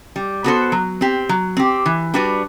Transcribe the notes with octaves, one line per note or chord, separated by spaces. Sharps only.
G3
B3 F#4 A4 C5
F#3
C4 G4
F#3
C4 G4
E3
G3 D4 F#4 B4